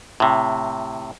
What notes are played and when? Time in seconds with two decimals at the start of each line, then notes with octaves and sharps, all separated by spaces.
0.20 A2 C3